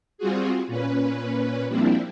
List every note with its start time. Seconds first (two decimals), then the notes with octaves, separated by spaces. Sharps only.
0.18 G3 C4 F4 F#4 G#4
0.67 A#2 C#4 B4
1.68 F3 G3 A#3 C4 D4 E4